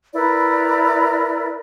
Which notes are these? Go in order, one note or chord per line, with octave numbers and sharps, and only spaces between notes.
E4 A#4 B4 D5